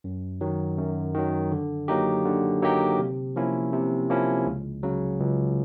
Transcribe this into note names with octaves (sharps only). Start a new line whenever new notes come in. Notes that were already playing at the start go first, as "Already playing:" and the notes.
F#2
D#3 F#3
F#2
D#3 F#3
D3
F#3 A#3 D#4 G4
D3
F#3 A#3 D#4 G4
C3
F3 A#3 C#4 E4
C3
F3 A#3 C#4 E4
C#2
C#3 F#3
C#2